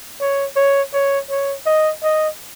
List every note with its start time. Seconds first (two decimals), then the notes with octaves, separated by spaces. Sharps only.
0.21 C#5
0.57 C#5
0.93 C#5
1.30 C#5
1.66 D#5
2.03 D#5